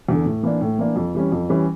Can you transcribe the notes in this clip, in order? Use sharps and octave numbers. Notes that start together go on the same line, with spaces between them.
E2 D3
A2
E3 A#3 D4
A2
E3 A#3 D4
F2
E3 G3 C#4
F2
E3 G3 C#4